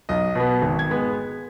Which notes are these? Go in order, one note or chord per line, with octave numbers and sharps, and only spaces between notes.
B1 D#5
B2 B3
G#1
G#6
G#3 B3